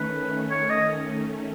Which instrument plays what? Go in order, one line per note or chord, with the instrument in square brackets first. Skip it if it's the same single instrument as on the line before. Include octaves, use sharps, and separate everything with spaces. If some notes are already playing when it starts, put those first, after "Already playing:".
Already playing: [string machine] D#3 A3 C#4 [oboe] B4
[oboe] C#5
D#5